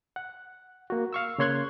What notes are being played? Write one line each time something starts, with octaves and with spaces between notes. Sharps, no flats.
F#5
A#3 F#4
F5 C#6 E6
C#3 A#3 C#5 C6 F#6 G#6